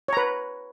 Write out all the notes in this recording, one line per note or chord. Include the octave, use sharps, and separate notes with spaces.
B4 C#5 A#5